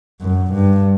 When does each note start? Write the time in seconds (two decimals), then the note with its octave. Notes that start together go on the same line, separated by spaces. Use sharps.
0.21 F#2
0.53 G2